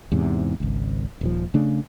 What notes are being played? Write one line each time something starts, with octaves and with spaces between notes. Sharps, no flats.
E2 G#2 C3
G#1 C#2
D#1 D#2 F3
C#3 A3 D4